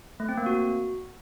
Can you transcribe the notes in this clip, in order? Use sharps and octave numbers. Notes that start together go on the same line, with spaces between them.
A3
C4
A#3
F#4